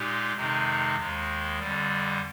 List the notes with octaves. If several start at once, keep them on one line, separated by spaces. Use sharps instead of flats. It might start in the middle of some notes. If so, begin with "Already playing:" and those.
Already playing: A#2 G#3 D#4 G4
F2 C3 D#3 G#3 D#4
D#2 D#3 G#3
F2 D3 G3